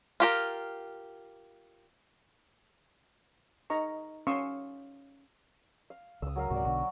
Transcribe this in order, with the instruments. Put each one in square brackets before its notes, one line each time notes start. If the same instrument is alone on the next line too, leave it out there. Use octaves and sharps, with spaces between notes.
[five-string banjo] F4 G4 A#4
[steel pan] D#4 D#5 A#5 C#6
C#4 F5 C6 C#6 D#6 E6
[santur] F5
[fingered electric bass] C#2 [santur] D#6 E6
[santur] F#3 A#4 F5
[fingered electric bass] C#2 G#2 C3 [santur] F#4 D5
[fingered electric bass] B1 B2 D3 [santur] F#4